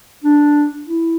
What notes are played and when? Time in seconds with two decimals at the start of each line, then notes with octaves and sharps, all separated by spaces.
0.24 D4
0.87 E4